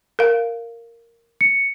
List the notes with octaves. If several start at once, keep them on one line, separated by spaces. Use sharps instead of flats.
A#4 F5
C#7